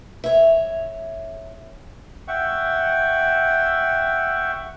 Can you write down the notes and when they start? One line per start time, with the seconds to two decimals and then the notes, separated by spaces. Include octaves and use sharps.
0.24 C#5 E5
2.28 E5 F#5 G5 C#6